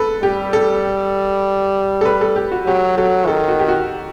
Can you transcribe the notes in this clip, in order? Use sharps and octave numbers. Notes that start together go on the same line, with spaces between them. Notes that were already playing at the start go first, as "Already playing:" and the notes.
Already playing: A4 B4
G3 G4
A4
A4
B4
A4
G4
F#4
F#3 G4
F#3 A4
D#3 A4
F#4
G4
F#4